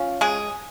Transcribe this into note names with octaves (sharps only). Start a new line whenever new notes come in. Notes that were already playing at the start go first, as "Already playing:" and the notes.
Already playing: C#4 F4
G#3 G#4